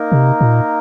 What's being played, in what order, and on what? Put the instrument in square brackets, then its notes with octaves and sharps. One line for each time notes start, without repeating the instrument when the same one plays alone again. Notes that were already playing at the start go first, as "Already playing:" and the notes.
Already playing: [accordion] A#3 D#4 A#4
[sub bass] C3
A#2